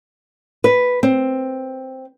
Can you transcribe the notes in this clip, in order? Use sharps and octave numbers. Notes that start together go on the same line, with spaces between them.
B4
C4